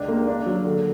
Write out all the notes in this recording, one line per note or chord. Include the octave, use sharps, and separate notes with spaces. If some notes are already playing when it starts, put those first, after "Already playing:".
Already playing: C#2 D4
A#3
D4
F#3
D3